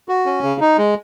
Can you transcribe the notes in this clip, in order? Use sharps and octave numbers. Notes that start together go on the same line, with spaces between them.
F#4
C#4
C#3
D#4
G#3